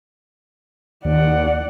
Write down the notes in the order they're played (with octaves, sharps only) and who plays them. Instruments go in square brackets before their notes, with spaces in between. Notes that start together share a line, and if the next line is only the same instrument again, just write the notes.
[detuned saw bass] D#2 [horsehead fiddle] D5 F#5